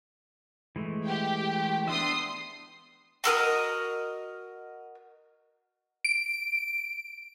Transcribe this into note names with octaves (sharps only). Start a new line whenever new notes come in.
E3 G#3 A3
G4 G5
B3 D4 E5 C6 D#6 C7
F#4 A4 A#4 D#5
D7